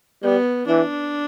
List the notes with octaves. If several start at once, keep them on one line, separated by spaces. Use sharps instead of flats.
G3 B3
E3 D4